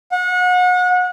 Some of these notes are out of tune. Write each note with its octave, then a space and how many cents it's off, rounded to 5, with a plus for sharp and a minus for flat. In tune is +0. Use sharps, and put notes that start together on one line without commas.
F#5 -35